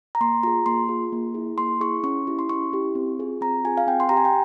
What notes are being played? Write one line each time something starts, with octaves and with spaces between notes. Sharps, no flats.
A#5
A#3 C6
F4 G#4 A#5
A#3 C6
F4 G#4
A#3
E4 G#4
A#3 C6
E4 G#4 C#6
C#4 C#6
E4 G4
C6
C#4 C#6
E4 G4
C4
F4 G#4
C4 A#5
F4 G#4 G#5
F5
C4 G5
C6
G4 A#5
G#5
G5